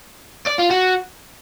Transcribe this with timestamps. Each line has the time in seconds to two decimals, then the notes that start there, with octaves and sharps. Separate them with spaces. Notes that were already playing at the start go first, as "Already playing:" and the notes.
0.47 D5
0.59 F4
0.71 F#4